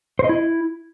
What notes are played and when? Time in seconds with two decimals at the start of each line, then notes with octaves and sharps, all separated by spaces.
0.19 C5
0.24 D#5
0.29 E4